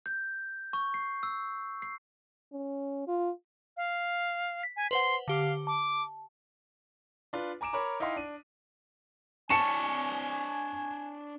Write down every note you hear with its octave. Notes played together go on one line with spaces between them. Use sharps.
G6
C#6
C7
E6
C7
C#4
F4
F5
B6
G#5
B4 C5 F#5 C6
D3 G4 F5 D6
A5 D6
D4 F4 B4
G#5 A#5 D6 D7 E7
A#4 C#5 A#5 B5 D6
D#4 E4 D#5 F5 G5 C6
D4 D#7
D4 C#5 G#5 A5 C#6 C#7 E7